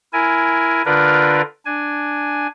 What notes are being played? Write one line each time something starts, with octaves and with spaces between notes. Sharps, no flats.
E4 A#4 G#5
D3 D4 F4 A#4 B4 D5
D4 G#5